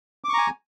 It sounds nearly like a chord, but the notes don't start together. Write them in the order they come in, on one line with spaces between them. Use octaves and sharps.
D6 C#6 A#5 G#5